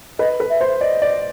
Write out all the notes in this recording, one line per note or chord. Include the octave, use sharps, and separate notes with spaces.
B4 D#5
B4
E5
C5
D5 D#5
D5